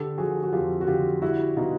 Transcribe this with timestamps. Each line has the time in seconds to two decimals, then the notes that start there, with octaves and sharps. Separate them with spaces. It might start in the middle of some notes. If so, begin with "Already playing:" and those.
Already playing: D3 G4 A4
0.18 F3 F#4 G#4
0.43 F#4
0.53 F2 F4 G4
0.81 F#4
0.87 D3 F4 G4
1.22 G3 E4 F#4
1.57 B2 D#4 F4